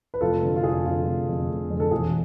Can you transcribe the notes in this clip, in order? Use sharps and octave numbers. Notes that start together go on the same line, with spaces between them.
B4
F1 F4 A4
F2 D3
F4
F1 G#4
F2 D3 F4
F1
F2 D3
F1
F2 D3
A4
E1 G#4